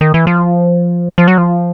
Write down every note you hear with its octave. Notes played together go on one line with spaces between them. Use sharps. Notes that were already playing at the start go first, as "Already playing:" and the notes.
D#3
E3
F3
F3
F#3
F3